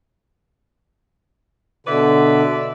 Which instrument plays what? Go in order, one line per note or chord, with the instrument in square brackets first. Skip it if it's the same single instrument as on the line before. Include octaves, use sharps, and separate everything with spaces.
[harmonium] B2 D3 [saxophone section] B4 D5 E5